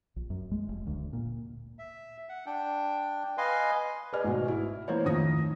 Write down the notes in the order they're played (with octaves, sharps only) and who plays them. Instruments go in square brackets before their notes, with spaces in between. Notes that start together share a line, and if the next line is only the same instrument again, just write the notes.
[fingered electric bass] A#1
F#2
G#3
F1
D2
A#2
[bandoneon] E5
F#5
D4 G5
B4 D#5 F5 G#5 C6
[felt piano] B4 D5 D#5 G#5 F6
G#1 B2
E4
E3 A#3 C5 C#5
F2 A2 D#3 D#6 A#6